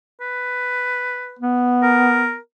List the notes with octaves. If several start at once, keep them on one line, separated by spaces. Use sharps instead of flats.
B4
B3
A#4